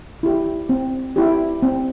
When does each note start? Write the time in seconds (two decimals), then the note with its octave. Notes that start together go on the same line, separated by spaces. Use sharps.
0.23 E4 G4
0.69 C4
1.16 E4 G4
1.62 C4